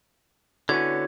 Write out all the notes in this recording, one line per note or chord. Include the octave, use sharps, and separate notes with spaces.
D3 B3 C#4 E4 F#4 C#5 G#6